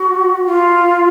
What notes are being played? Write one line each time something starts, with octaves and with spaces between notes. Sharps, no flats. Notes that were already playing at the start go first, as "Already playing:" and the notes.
Already playing: F#4
F4